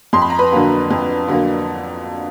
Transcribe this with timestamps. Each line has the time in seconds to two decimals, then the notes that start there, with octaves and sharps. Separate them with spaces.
0.13 F2 C6
0.22 B5
0.30 A#5
0.39 B4 B5
0.52 D3 F#3 A#3
0.91 F2
1.28 D3 F#3 A#3